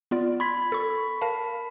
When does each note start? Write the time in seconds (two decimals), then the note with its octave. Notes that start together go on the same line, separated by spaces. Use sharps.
0.11 B3 F4 D5
0.40 B5 C6 G#6 B6
0.72 A4 C#6
1.21 A#4 F5 A5